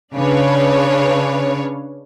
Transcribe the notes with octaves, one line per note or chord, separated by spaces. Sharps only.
C#3 D4 B4 C#5 F5